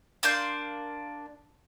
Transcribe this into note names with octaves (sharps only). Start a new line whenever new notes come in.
A#3 D4 C6 G6